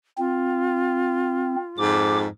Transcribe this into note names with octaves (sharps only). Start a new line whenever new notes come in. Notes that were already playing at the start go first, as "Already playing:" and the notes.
C4 F4
F2 G#2 D6